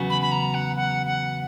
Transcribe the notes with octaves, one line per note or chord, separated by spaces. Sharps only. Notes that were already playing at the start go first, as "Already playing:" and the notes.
Already playing: E2 C#3 F#3 B3 F#4
B5
B5
A#5
F#5
F#5
F#5